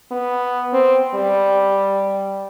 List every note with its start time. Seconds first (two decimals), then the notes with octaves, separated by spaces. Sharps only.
0.11 B3
0.73 C4
1.15 G3